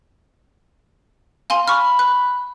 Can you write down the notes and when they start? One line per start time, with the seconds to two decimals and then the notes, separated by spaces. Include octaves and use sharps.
1.50 F5 G#5 C6
1.68 B5 C#6 F6
1.99 F#6